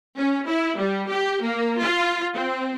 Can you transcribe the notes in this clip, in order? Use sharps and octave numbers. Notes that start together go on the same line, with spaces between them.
C#4
E4
G3
G4
A#3
F4
C4